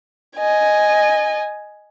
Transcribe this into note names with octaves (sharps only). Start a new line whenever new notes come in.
D#5 G#5